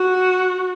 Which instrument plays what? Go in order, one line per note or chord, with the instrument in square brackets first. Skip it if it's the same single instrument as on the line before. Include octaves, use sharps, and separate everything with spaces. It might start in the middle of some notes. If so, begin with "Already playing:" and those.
Already playing: [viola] F#4